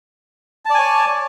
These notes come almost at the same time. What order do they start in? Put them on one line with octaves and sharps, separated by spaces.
A5 D5 G#5 C#5